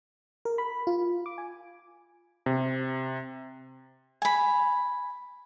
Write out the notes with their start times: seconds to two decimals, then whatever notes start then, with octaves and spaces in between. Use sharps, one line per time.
0.45 A#4
0.58 B5
0.87 F4
1.26 D6
1.38 G#5
2.46 C3
4.22 G#5 B5